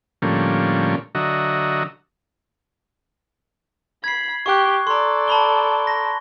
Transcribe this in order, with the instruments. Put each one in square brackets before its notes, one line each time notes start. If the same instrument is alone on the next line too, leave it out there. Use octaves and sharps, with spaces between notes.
[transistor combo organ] A2 D3 F3 G3 A#3 C#4
D3 F#3 F#4 D#5 E5 A#5
[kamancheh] B5 [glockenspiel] G#6 C7
[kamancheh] G4 [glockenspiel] C#6 F#6
[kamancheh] A4 D5 [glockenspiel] A#5 C6
[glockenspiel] A5 B5 G7
A#6